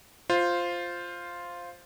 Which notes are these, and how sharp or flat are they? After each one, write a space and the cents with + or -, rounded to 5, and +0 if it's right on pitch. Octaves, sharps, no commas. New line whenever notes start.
F4 +0 C5 +0